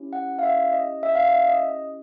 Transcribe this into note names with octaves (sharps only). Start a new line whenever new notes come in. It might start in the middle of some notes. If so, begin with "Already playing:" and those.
Already playing: C#4 E4 G4
F#5
F5
E5
D#5
E5
F5
E5
D#5